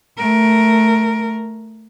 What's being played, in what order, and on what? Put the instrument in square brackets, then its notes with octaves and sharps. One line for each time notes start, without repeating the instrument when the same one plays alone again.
[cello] A3 A#4